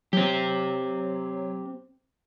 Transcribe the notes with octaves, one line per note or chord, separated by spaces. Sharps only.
F#3 C4 G4